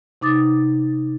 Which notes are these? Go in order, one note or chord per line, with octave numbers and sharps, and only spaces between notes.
C3 D#4 D6 D#6 A6